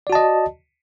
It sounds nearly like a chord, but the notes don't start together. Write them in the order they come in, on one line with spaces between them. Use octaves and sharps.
D5 F#4 A5 D#5